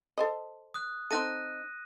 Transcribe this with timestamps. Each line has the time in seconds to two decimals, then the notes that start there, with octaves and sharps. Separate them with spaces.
0.18 A4 C5 D#5
0.74 D#6 F#6
1.11 C4 D#4 A4 F#6 A#6 D#7